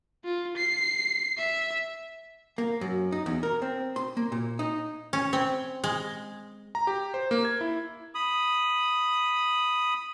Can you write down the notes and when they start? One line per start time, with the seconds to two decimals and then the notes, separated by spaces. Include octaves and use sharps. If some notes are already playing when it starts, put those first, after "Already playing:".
0.25 F4
0.57 C7
1.38 E5
2.58 A#3
2.81 F#2
3.12 D#4
3.26 E2
3.43 A#4
3.62 C4
3.96 C6
4.17 A#3
4.32 A#2
4.59 D#4
5.13 C#4
5.33 C4
5.84 G#3
6.75 A#5
6.87 G4
7.14 C5
7.31 A#3
7.45 G#6
7.61 E4
8.15 B5 D#6